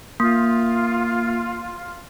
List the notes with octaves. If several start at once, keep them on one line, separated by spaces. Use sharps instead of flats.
A#3 F4